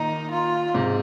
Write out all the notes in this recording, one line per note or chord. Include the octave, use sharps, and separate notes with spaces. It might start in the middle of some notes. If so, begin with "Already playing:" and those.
Already playing: A#2 D#3 D#4
F4
G#2 C3